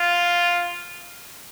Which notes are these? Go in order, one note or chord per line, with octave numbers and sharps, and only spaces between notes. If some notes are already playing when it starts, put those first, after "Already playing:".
Already playing: F4